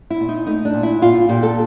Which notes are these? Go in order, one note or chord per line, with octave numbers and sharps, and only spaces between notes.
E4
A#2
D#4
A3 D#4
D4
A#2
E4
A#2 F4
A#2 G4
A4